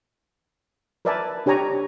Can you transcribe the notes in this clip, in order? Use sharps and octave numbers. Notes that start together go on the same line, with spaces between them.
A#4 B4 D5 E5 G#5 A5
D4 G4 C#5 G#5 A#5 C#6